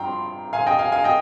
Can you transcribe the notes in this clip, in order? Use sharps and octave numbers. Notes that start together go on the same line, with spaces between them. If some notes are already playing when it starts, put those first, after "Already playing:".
Already playing: G2 F3 G5 A#5 C6
F5 G#5
D#5 G5
F5 G#5
F5 G#5
D#5 G5